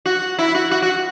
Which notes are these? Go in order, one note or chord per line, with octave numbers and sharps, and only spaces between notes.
F#4
E4
F#4
F#4
F#4